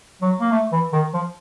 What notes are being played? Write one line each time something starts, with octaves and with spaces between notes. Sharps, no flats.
F#3
A#3
A3
E3
D#3
F3